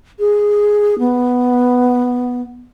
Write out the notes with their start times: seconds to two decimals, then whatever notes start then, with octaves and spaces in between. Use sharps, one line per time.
0.19 G#4
0.99 B3